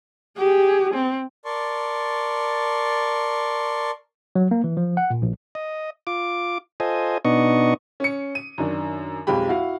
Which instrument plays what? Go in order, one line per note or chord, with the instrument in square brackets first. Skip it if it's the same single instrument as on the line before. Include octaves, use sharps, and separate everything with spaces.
[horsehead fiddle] G4 G#4
C4
[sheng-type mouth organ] A#4 D5 A5 C6 C#6
[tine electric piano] F#3
A#3
E3
F3
F#5
A#2
A#1
[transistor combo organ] D#5
F4 D6
F4 A4 C5 D#5 G#5
B2 B3 D4 D#4 D#5 C#6
[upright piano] C#4 C#7
D#7
F#2 D#3 D4
B1 F2 G#3 G4 B5
E4 F#4 F5